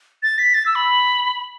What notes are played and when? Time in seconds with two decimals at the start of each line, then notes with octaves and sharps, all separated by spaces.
0.23 A6
0.38 B6
0.54 A6
0.66 E6
0.75 B5